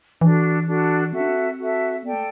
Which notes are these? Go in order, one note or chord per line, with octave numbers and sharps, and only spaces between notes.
E3 D4 F#4 A4
D4 F#4 A4
C4 F#4 A4 E5
D4
C4
F#4 A4 E5
B3 A4 D5 G5
A3